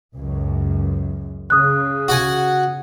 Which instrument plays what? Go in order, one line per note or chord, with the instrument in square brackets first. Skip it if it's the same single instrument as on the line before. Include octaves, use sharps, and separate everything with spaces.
[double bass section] C#2 F#2
[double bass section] C#3 [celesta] D#6 F#6
[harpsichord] F#4 F#5 G#5